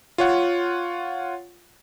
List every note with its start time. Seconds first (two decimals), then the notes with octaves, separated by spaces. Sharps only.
0.18 F4 C#5 F#5